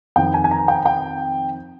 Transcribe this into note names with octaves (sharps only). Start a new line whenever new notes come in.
F2 D#3 G5
G#5
G#5
A#5
G5
G5